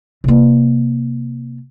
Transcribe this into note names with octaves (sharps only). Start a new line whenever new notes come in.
C3 A#3